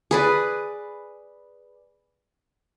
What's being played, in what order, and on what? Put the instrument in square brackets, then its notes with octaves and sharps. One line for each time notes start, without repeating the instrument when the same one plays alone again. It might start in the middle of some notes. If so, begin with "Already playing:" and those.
[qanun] G#4 B4 D5